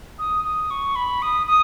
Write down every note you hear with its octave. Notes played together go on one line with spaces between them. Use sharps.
D#6
D#6
C#6
B5
D#6
D#6